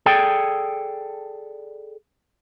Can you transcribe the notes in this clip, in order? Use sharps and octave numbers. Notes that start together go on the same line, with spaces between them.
G#4 A4 D5 G5